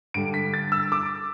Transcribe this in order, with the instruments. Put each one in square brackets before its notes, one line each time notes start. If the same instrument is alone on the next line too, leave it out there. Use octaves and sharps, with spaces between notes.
[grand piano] G2 D3 G3 D7
B6
A6
E6
D6